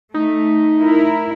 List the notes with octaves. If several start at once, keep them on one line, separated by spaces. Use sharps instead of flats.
A3 D#4
E4 A#4